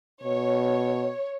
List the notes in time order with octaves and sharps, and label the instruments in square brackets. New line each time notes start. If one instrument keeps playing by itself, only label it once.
[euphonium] B2 [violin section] C#5